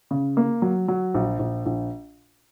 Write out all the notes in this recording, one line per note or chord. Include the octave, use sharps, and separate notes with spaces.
C#3
A#3
F#3
F#3
A#1
A#1
A#1